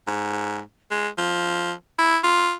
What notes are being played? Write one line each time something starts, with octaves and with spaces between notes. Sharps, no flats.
G#2
G#3
F3
E4
F4